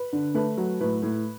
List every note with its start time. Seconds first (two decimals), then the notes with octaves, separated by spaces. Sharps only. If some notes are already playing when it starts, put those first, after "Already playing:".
Already playing: B4
0.13 D3
0.34 A3 B4
0.57 F#3
0.80 A2 B4
1.02 A2